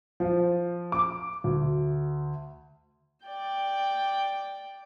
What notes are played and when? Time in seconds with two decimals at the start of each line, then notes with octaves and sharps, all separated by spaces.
0.20 F3
0.92 D6
1.44 D2
3.25 D5 G5